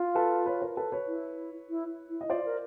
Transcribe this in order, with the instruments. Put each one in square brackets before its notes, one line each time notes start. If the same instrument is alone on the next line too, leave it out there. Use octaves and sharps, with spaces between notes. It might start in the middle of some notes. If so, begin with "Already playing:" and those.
Already playing: [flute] F4
[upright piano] A4 B4
B4 C#5
A#4 C5
A4 B4
B4 C#5
[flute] E4
E4
E4
[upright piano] D#5
[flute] F4 [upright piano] C5 D5
[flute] A#4